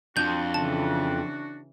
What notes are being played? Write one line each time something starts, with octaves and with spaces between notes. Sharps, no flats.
F2 D4 F#4 G6
C#3 E3 A5